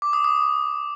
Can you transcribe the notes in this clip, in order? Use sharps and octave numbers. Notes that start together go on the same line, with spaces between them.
D6
D#6
D#6